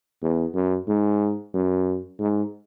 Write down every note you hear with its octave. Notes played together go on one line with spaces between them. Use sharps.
E2
F#2
G#2
F#2
G#2